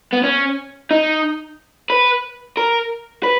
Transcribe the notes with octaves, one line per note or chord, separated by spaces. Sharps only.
B3
C#4
D#4
B4
A#4
B4